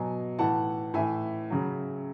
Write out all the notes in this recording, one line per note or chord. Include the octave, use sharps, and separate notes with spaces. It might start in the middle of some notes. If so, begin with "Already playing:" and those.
Already playing: B2 F#3 G#5
A2 E3 F#5 A5
A2 E3 E5 G#5
C#3 F#3